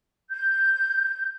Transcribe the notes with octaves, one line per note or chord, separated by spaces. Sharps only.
G6